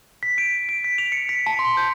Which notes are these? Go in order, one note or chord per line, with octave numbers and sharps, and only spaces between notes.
B6
D7
D7
B6
F7
C#7
B6
A5
C6
G6